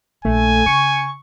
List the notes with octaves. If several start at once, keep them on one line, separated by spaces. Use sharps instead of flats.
A#1 A3 G#5
C#3 C#6